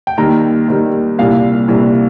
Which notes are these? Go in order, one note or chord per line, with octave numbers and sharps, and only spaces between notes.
G5
D#2 D#3 G3 A#5
D#2 D#3 G3
C2 A#2 G3 F5
C2 A#2 G3